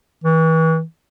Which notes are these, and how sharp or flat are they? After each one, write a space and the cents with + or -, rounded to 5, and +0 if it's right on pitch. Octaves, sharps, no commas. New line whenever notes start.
E3 -35